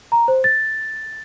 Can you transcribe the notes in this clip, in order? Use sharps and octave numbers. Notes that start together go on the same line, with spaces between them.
A#5
C5
A6